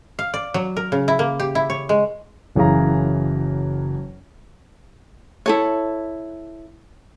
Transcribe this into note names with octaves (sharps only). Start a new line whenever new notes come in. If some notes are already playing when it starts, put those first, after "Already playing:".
F5
D5
F#3
A#4
C#3
E4
A#3
G4
E4
C#5
G#3
F#1 F#2 E3 G#4 F5 A#5
E4 A4 C#5